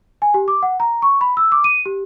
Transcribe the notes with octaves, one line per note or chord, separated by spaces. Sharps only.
G#5
G4
D6
F#5
A#5
C#6
B5
E6
D6
D#7
G4